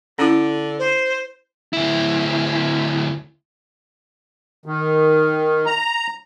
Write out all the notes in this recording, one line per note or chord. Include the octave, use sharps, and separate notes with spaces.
D3 C#4 E4
C5
D2 E4
D#3
A#5